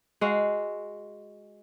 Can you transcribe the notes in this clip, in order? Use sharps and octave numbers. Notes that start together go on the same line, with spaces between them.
G#3 F#4 F5